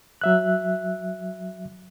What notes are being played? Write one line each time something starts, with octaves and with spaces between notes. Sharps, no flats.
F#3 E5 F#6